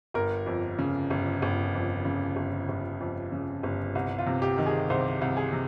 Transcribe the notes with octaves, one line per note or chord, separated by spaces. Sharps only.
G1 A#4
F2
C#3
G1
G1
F2
C#3
G1
G1
F2
C#3
G1
C2
F4
C3
G4
D#3
G#4
C2 C5
C2
G#4
C3